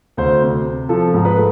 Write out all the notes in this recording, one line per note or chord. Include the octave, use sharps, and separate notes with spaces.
D2 C5
C3
C3
F3 A4
G#2
B4
A3